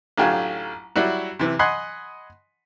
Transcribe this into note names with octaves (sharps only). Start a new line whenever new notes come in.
A1 D3 F#3 F4 G4 G#5
F#3 G3 E4 F#4
C3 E3
D#5 F#5 G#5 B5 C6